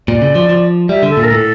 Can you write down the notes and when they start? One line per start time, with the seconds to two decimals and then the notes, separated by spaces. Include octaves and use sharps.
0.08 A#2 D5
0.22 C#3
0.35 F3
0.49 F3
0.89 G3 E5
1.03 D3
1.10 A4
1.17 A#2
1.24 A#4
1.30 A2 A4